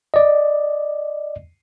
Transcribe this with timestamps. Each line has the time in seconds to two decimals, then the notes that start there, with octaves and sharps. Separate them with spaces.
0.14 D5 D#5